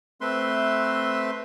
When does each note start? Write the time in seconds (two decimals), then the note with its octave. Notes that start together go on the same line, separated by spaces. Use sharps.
0.21 A3 C4 B4 E5 C6